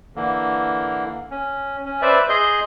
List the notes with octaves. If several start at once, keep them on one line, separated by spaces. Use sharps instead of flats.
D3 E3 A#3
C#4
C#4
B4 C5 D5 E5
G#4 D#5 C6 G6